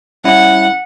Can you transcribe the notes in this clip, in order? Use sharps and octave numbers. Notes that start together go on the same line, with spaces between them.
G3 C#4 E4 F#5